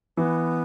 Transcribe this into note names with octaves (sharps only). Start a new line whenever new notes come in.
E3 B3